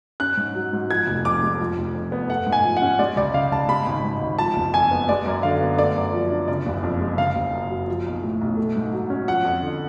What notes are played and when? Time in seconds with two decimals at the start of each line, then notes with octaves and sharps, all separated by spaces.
0.20 C#4 F#6
0.37 G#2
0.55 F#3
0.73 G#2
0.90 F3 G#6
1.07 F1
1.25 F2 D6
1.43 G#3
1.60 F3
1.77 F1
1.95 F2
2.12 B3
2.30 A3 F#5
2.46 G#2
2.52 G#5
2.65 F3
2.77 F#5
2.82 C#4
2.99 G#3 D5
3.16 C#2 D5
3.34 C#3 F5
3.52 C#2 A5
3.69 G#3 B5
3.86 G#1
4.04 G#2
4.22 G#1
4.39 F3 A5
4.56 F#1
4.74 F2 G#5
4.91 B3
5.09 G#3 D5
5.26 F#2
5.43 D3 F5
5.61 B3
5.78 A3 D5
5.96 F#2
6.13 F3
6.31 D4
6.48 C#3 D5
6.66 F#1
6.83 F2
7.01 G#3
7.18 C#3 F5
7.35 F#1
7.53 F#2
7.70 F#3
7.88 F3
8.06 B1
8.23 A2
8.41 B1
8.57 A3
8.76 G#2
8.93 F#3
9.10 C#4
9.28 F3 F#5
9.45 F2
9.62 D3